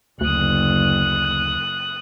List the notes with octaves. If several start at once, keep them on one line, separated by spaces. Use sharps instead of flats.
F#1 D2 D#6 F#6